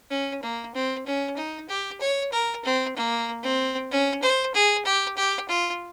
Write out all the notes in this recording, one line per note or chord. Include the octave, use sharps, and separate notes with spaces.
C#4
A#3
C4
C#4
D#4
G4
C#5
A#4
C4
A#3
C4
C#4
C5
G#4
G4
G4
F4